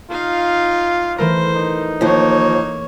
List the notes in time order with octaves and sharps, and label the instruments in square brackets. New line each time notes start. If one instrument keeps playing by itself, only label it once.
[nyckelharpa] D#4 F5 [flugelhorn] F4
[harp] E3 A3 A#4 [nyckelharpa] C5
[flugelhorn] D#4
[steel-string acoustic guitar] D#2 F3 [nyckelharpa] A#3 C#5